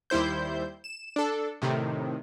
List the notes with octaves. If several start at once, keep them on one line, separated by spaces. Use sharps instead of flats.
D#2 G3 E4 C5 G6
E7
D4 A4
A2 C3 D#3